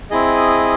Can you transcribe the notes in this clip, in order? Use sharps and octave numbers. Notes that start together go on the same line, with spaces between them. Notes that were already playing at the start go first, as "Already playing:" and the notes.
C4 E4 G#4 D#5